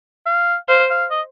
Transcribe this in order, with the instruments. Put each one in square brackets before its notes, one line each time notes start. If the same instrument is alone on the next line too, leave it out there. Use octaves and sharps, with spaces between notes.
[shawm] F5
[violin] C5 [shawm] F5
[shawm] F5
D#5